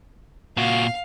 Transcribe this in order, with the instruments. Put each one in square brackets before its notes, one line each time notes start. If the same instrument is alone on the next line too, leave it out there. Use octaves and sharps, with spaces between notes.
[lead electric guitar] A#2 F#4 [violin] F5